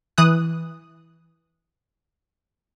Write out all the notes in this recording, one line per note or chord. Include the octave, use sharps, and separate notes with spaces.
E3 D#6 F#6